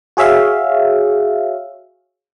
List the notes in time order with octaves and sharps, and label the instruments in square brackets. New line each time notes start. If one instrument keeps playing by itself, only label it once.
[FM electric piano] F#4 G#4 C#5 E5 F5